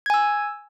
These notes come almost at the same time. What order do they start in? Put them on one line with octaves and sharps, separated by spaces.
G#6 G#5 E6